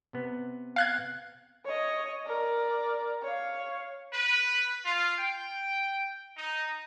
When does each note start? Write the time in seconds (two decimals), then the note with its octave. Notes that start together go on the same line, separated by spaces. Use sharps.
0.13 C3 B3
0.76 F5 F#6 G#6
1.65 C#5 D#5
2.26 A#4 D5
3.22 C#5 F5
4.13 B4
4.85 F4
5.18 G5
6.37 D#4